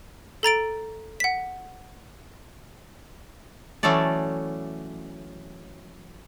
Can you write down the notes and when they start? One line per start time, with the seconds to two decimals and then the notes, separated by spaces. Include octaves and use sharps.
0.43 A4 A#5 A6 D7
1.20 F#5 B6
3.83 E3 F#3 A3 C#4 A4 D5